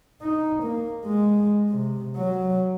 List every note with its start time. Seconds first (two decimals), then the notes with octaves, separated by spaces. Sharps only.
0.22 D#4
0.63 A#3
1.05 G#3
1.70 C3
2.17 F#3